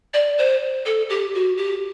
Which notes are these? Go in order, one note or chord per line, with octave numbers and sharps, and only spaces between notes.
D5
C5
A4
G4
F#4
G4